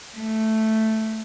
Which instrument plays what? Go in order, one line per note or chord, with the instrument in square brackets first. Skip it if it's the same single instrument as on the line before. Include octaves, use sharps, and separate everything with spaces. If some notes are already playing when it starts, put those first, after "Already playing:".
[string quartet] A3